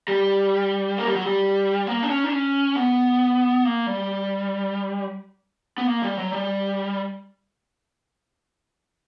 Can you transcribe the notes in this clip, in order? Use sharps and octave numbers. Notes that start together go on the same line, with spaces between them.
G3
A#3
G3
F#3
G3
A#3
D4
C#4
D4
C#4
B3
A#3
G3
B3
A#3
G3
F#3
G3